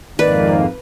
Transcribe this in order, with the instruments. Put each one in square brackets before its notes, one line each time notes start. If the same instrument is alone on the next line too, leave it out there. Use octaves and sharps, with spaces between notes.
[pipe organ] F2 G#2 A#3 [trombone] D#3 [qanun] B4 [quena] D5